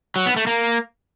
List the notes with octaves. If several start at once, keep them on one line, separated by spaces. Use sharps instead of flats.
F#3
B3
A3
A#3